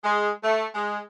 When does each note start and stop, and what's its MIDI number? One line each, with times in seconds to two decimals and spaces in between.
0.04 0.30 56
0.44 0.66 57
0.75 0.99 56